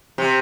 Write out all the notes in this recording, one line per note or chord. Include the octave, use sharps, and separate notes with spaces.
C3